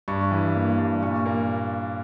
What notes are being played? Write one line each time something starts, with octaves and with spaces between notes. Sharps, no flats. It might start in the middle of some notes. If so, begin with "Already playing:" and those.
G2 C#6
E3
A#3
G2
A#2 C#6
A#3